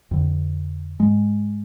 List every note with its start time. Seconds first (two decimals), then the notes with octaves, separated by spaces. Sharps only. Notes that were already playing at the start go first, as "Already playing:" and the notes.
0.11 F2 D3
1.00 G#2 G#3